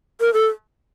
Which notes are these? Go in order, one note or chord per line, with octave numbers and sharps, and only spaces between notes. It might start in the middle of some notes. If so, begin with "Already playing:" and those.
A#4
A4